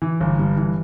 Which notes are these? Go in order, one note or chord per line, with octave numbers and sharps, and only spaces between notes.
E3
G1
G2
E3